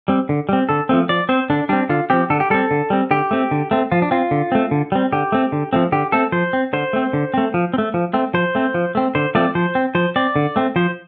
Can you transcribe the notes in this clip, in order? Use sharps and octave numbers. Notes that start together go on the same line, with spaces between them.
G3 C4
D3
G3 C4
D3 A4
F3 A3 C4
F3 D5
C4 C5
D3 D4
G3 C4 D4
D3 F4
F3 C4 G4
D3 A4
G4
G3 C4 A4
D3
G3 C4
D3 G4
A3 C4
D3
A3 C4
F3 F4
D4
C4 F4
D3
A3 C4
D3
G3 C4
D3 G4
A3 C4
D3
F3 A3 C4
D3 G4
A3 C4 A4
F3 C5
C4
D3 C5
A3 C4
D3
A3 C4
F3
C4
A3
F3
A3 C4
F3 C5
A3 C4
F3
A3 C4
D3 C5
F3 A3 C4 D5
F3 C5
C4
F3 C5
C4 D5
D3
A3 C4
F3 C5